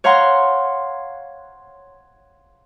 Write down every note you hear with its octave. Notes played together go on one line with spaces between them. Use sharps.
C#5 F5 F#5 A#5 C6